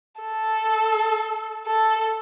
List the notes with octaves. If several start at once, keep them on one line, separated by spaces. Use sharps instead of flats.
A4
A4